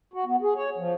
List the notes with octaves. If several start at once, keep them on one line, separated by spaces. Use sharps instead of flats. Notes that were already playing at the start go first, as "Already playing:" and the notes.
F#4
B3
G#4
C#5
F3